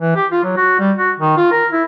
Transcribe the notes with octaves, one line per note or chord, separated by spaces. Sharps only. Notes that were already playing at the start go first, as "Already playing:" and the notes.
E3
G4
F4
F#3
F#4
G3
F#4
D#3
F4
A#4
E4